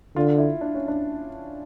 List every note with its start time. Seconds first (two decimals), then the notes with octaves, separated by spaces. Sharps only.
0.16 D3 F4
0.38 E4
0.61 D4
0.75 C#4
0.88 D4